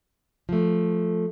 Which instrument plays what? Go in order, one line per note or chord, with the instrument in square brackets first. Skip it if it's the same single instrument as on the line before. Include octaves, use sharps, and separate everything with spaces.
[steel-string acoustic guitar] F3 A3